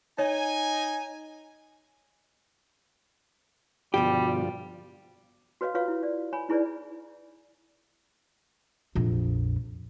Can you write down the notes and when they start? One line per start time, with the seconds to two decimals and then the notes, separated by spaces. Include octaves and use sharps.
0.18 D#4 C#5 G#5
3.94 G2 B2 D3 F3 G3 G4
5.61 F#4 B4 C#5 D#5 F5
5.74 F4 B4 C#5 F5
5.88 E4
6.03 D5
6.33 C#5 G#5 B5
6.49 D#4 E4 G#4 B4 C#5 D5
8.95 A#1 F2